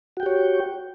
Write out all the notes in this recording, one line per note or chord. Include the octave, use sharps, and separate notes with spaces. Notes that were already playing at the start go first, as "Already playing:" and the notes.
F#4 G4 C#5 G5